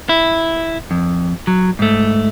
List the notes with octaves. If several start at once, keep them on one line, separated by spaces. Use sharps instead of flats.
E4
F2
F#3
G#2 A3